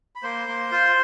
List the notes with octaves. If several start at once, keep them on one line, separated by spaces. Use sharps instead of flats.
B5
A#3 C5 C6
A#3
F4